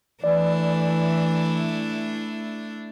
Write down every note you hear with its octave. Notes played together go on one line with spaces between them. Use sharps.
E3 A3 D4 E4 D5